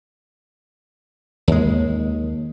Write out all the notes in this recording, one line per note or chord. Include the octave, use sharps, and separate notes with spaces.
D#2 G#3